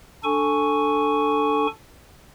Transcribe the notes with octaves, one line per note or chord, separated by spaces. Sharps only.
D4 A4 G#5 C#6